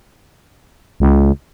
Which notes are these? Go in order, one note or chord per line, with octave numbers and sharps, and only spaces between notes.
C#2